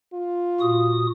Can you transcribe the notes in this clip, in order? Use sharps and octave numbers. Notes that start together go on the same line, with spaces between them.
F4
A#2 F#4 D#6